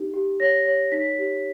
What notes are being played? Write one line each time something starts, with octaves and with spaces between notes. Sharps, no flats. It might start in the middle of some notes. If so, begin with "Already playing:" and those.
Already playing: D#4 G4
G4
C#5 A#6
C#5
D#4 B6
G4